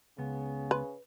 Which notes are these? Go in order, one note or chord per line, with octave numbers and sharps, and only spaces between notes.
C#2 C#3 B3
B4